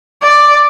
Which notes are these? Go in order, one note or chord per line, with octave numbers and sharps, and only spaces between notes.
D5